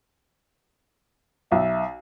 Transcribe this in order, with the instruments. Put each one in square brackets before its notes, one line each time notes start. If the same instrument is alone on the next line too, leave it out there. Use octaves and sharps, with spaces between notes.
[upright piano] B1 [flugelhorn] E5